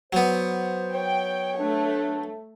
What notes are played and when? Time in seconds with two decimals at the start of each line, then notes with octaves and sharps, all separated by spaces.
0.13 F#3 B3 C5
0.94 C#5 G5
1.59 A3 D4